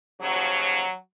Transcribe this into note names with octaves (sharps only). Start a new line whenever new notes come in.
D#2 C#3 F3 F#3